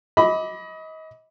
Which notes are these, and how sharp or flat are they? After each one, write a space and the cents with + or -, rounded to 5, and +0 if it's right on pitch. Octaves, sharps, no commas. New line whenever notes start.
D#5 +30 B5 +0 D6 -5